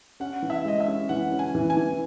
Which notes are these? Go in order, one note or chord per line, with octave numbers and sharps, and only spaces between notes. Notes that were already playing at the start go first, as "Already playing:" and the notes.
C#4 F#5
E3
E5
G#3 D#5
E5
C#4
E3 F#5
C#4
G#5
E3
G#5
E3